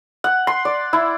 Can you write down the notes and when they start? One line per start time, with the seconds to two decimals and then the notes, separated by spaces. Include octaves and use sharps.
0.24 F#5
0.47 C6
0.65 D5
0.93 E4